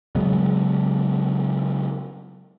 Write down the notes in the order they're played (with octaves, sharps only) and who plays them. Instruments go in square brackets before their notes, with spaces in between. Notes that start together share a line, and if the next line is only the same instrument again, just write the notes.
[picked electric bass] C#3 F#3 G#3 B3